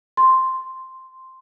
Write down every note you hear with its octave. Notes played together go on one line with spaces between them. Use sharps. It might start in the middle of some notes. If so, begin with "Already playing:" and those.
C6